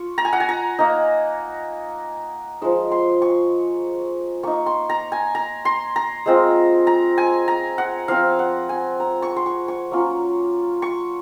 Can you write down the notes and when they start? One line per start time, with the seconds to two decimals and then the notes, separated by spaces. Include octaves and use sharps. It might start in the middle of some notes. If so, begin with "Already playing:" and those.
Already playing: F4 C#6
0.18 A#5
0.25 G#5
0.33 F#5
0.40 G#5
0.49 A#5
0.79 A#3 D#4
2.62 F3 G#3 D#4
2.92 C6
3.22 C#6
4.43 A#3 D#4 C#6
4.66 C6
4.90 A#5
5.12 G#5
5.35 A#5
5.65 C6
5.96 A#5
6.26 G#3 C4 F4
6.87 A#5
7.18 G#5
7.48 A#5
7.78 F#5
8.08 F3 C4 F4 F5
8.39 F#5
8.69 G#5
9.00 A#5
9.22 C#6
9.36 C6
9.46 C#6
9.68 C#6
9.91 F#3 A#3 C#4 F4
10.82 C#6